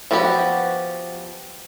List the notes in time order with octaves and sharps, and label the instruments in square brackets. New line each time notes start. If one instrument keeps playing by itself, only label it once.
[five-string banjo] F3 B3 F#4 G4